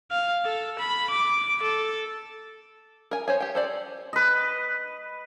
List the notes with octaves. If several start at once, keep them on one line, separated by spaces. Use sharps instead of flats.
F5
A4
B5
D6
A4
A#4 G#5
C5 C#5 G#5
G4 G5
A4 C5 D5
B4 D#5